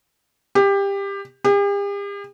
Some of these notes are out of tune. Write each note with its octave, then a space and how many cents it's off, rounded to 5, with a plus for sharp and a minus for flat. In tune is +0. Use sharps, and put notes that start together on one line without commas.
G4 +20
G4 +45